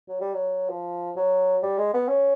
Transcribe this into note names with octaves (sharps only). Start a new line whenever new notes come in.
F#3
G3
F#3
F3
F#3
G3
G#3
B3
C#4